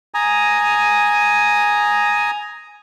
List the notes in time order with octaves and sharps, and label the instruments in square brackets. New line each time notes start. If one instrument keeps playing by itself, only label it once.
[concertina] G#5 A#5 D#6